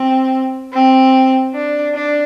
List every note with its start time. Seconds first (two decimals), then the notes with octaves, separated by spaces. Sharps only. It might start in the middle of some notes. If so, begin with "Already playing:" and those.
Already playing: C4
0.73 C4
1.54 D4
1.94 D4